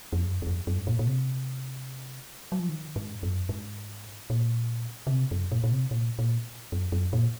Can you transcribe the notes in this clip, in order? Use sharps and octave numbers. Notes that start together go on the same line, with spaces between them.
F2
F#2
F#2
F2
F#2
G#2
A#2
A#2
C3
F#3
F3
D#3
G#2
F#2
G#2
A#2
C#3
C3
F#2
A#2
A#2
C3
A#2
A#2
F#2
F#2
A#2